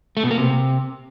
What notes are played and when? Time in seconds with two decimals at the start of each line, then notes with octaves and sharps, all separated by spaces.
0.17 A3
0.24 B2
0.31 A#3
0.38 C3